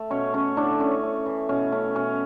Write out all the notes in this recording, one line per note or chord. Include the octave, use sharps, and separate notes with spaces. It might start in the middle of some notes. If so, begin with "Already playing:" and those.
Already playing: A3
B2 C#4 C#5
A3 C#4 C#5
A2 D3 D4
A2 C#4
A3
E3
B2 C#4
A3 C#4
B2 C#4